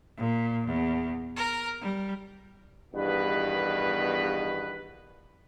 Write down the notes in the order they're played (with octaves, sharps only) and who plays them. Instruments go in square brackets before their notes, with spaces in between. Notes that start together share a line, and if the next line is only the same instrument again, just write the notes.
[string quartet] A#2
E2
A#4
G3
[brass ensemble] E2 G2 B2 D#3 B4